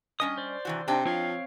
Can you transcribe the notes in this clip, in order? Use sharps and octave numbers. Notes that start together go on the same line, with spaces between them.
G3 C#4 D#5 D#6
C5 D5
C3 E3 F#4
C3 D4 D#4 G5
F3 C4 C#5 F5